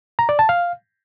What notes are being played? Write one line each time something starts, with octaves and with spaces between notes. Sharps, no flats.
A#5
D5
A5
F5